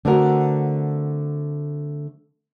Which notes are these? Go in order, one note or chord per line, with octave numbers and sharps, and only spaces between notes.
D3 A3 C4 F#4 A#4